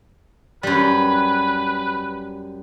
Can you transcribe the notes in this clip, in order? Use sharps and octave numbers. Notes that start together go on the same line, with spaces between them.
F#2 G3 B4